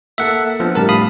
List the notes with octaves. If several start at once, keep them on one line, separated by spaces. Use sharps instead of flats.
A#3 A4 E5 F#5
F3 B3 D4
A2 G3 A#4 A5
F5 B5 D#6